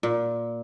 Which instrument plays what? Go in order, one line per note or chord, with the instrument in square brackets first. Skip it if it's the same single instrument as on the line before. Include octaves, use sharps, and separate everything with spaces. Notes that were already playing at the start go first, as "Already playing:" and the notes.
[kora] A#2